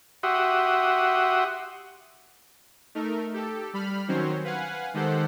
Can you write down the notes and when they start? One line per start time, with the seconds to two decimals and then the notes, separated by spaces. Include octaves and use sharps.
0.23 F#4 G4 E5 F#5 C6 D#6
2.95 A3 D#4 A#4
3.34 G4 A4
3.73 G3 B5 F6
4.08 D#3 F#3 C4 C#4 C5 C#5
4.44 B4 F5 F#5 G#5
4.94 D#3 G#3 G4 A4 C5 F#5